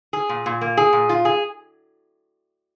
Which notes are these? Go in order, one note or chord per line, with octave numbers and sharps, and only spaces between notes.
G#4
A#2
A#2
A#3
G#4
A#2
F4
G#4